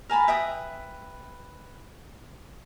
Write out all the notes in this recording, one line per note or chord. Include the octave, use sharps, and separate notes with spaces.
A#4 G#5 A5 B5
B4 E5 G5 D#6